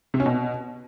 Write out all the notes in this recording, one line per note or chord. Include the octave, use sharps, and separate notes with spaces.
C3
C#4
B2